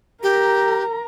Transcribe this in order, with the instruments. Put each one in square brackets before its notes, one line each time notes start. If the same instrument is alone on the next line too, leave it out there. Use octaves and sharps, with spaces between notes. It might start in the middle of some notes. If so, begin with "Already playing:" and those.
[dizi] G4 [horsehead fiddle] A#4 A#5